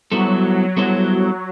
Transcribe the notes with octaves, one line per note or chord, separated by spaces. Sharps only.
F#3 G3 B3 E4 A4 C5
G3 B3 E4 A4 C5